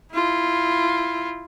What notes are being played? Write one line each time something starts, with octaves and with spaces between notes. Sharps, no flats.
E4 F4